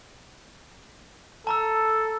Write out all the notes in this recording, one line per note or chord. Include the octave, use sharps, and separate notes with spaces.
A4 A5 A#5 E6